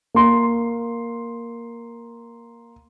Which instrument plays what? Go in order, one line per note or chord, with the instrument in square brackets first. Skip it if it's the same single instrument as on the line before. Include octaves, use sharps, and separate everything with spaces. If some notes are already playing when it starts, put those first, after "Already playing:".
[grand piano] A#3 C6